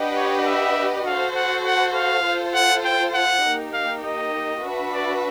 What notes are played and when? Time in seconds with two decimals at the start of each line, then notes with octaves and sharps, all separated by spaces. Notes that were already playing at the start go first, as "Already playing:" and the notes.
Already playing: D4 G4 B4 D#5 F#5
0.16 C#5
0.46 E5
1.06 F#4 A4 C5 F5
1.35 F#5
1.65 F#5
1.95 F5
2.25 F4 A4 C5
2.54 F#5
2.85 G5
3.14 F#5
3.44 A#3 D#4 G4
3.73 F5
4.04 D#5
4.63 D4 F#4 B4 E5
4.93 D5